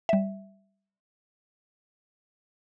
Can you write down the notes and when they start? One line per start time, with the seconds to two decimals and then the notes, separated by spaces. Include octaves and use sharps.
0.09 G3 E5